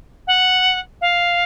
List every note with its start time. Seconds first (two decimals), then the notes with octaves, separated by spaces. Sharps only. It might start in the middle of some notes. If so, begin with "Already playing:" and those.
0.27 F#5
1.01 F5